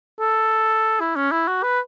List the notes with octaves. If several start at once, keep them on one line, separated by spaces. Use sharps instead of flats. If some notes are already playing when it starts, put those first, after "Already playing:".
A4
E4
C#4
E4
F#4
B4